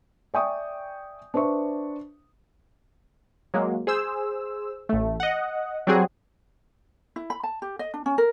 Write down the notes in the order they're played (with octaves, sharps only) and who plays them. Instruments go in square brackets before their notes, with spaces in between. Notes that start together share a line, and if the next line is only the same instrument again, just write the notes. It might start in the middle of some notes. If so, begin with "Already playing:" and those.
[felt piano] D5 E5 G5 G#5 C#6 D#6
D4 B4 C5 E5 C#6
[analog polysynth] F#3 G#3 A#3
G#4 C5 E6
A1 A3
D#5 F#5
F#3 G3 C4 F#4 G#4
[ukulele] E4
B5
A5
G4
D#5
D4
C#4
A#4